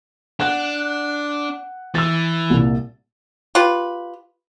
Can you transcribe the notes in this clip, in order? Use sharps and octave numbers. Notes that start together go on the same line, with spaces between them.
D4 F#5 F#6
E3 E6 A6
C2 A#2
F4 G4 B4